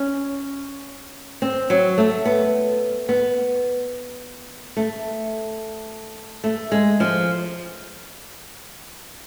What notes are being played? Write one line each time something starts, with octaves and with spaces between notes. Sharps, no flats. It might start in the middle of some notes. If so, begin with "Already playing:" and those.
Already playing: C#4
C4
F#3
A3
B3
B3
A3
A3
G#3
F3